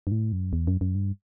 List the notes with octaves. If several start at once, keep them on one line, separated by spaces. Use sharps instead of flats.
G2
A2
F#2
E2
F#2
F#2
G2